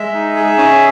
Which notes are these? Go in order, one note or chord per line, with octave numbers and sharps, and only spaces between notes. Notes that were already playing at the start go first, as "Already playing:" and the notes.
Already playing: G#3 E5
D#4
G#4
C#4